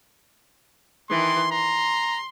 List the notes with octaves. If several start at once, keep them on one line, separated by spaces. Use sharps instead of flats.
D#3 E3 C6
A#5 C6